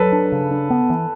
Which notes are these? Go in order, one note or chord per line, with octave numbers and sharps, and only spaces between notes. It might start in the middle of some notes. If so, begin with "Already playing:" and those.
Already playing: F#3 A4 B4
D4
C#3
D4
B3
E3